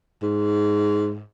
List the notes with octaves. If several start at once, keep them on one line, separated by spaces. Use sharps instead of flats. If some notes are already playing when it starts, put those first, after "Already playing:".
G#2